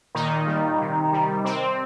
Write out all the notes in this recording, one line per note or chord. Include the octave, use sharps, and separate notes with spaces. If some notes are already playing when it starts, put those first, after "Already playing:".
A#2 D#3 D#4
G3
C3
G3
C3 C4